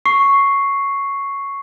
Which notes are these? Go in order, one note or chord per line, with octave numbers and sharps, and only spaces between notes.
C#6 C7